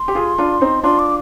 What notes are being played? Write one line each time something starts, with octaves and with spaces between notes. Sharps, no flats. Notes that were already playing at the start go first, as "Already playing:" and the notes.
Already playing: C6
G4
F4 G#4
D4 F4
C4 D#4
D4 F4 C6
D6